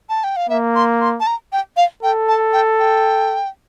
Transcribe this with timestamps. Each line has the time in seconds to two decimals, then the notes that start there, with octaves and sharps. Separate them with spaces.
0.09 A5
0.24 G5
0.36 F5
0.49 A#3 E5
0.75 C6
1.01 C6
1.20 A5
1.27 A#5
1.52 G5
1.77 F5
2.03 A4 G5
2.28 A5
2.53 G5
2.79 G5